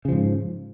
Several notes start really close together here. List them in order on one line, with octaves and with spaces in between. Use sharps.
C#3 F3 G#2